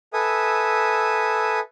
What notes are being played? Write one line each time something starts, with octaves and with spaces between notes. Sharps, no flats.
A4 B4 E5 G#5 D#6